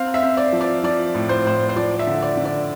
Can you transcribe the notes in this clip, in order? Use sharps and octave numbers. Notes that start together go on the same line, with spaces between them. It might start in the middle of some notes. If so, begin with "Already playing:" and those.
Already playing: C4 F5
E5
C4
D5
F3
D5
F3 D5
A2
C5
A2 C5
C5
F3 D5
E5
D3
D5
D3
D5